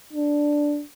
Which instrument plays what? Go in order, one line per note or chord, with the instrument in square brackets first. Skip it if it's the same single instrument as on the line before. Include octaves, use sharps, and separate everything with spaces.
[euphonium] D4